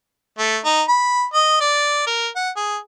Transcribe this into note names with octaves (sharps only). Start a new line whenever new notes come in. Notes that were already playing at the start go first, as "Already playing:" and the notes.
A3
D#4
B5
D#5
D5
A#4
F#5
G#4